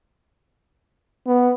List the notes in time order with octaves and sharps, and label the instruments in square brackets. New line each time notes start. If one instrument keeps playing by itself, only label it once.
[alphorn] B3